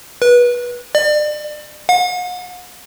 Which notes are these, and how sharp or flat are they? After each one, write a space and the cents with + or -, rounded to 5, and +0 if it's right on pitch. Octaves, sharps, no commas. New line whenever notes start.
B4 -25
D5 +35
F#5 -45